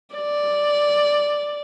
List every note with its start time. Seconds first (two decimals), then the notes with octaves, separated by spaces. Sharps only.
0.15 D5